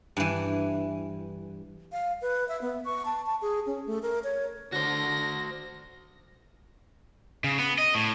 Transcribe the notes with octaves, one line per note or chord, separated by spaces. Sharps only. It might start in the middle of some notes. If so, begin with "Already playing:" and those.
G2 E3
F5
B4
E5
B3
C#6
A5
A5
G#4
C#4
A3
A#4
C#5
D3 F#4 C5 A#6
C#3
B3
D#5
A2